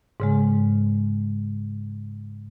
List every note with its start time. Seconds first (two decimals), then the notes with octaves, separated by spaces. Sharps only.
0.20 G#2 C#3 G#3